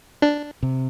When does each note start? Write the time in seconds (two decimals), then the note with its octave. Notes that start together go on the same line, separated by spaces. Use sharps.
0.22 D4
0.63 C3